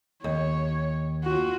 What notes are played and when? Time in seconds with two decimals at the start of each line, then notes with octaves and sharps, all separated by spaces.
0.24 D#2 C#5
1.24 F4 F#4